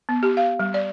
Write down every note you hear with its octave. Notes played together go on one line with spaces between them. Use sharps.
B3
G4
F5
G3
D5